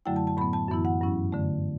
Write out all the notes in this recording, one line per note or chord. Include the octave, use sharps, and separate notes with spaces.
F#2 D3 F#3 A3 E4 G5
A5
A5
A2 F#3 B3 B5
A5
F#2 E3 B3 E4
F#5
G2 F#3 C#4 E4
G2 D3 A3